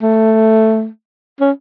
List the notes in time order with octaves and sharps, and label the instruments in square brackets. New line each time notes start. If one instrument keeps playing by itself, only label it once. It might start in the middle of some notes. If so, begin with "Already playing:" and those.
[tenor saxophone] A3
C#4